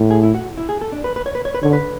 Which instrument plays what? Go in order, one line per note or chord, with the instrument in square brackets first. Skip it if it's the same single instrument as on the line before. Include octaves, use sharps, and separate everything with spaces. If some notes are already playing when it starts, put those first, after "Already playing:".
Already playing: [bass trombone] A2
[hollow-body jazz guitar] G#4
E4
F#4
E4
G#4
A4
D4
B4
B4
C#5
B4
C#5
B4
[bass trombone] D3 [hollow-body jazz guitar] C#5
[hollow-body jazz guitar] B4